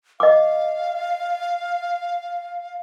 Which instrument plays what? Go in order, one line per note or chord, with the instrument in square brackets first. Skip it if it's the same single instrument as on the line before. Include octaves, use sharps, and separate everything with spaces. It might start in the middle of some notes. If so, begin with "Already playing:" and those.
[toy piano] D#5 D6 [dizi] F5